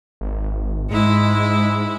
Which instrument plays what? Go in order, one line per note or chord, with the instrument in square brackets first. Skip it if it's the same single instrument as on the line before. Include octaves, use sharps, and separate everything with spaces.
[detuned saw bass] G#1
[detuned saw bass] G#2 [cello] G#3 E4